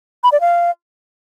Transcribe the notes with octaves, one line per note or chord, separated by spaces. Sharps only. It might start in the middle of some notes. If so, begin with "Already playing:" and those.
B5
D5
F5